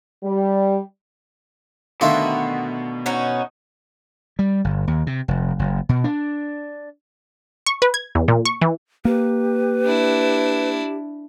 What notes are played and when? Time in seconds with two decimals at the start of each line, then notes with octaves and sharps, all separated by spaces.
0.24 G3
2.01 B2 D3 D#3 A3 D4 F4 F#4 E5
3.06 C#4 D#4 F#4
4.39 G3
4.64 G1
4.87 D#2
5.07 C3
5.28 F1
5.59 F#1
5.89 B2
6.04 D4
7.66 C#6
7.82 B4
7.94 G#6
8.15 E2
8.28 A#2
8.45 C#6
8.61 E3
9.05 A#3 G4 B4
9.85 D4 E4